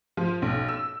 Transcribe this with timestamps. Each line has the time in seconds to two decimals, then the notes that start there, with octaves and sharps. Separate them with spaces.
0.17 F3
0.42 B1
0.69 E6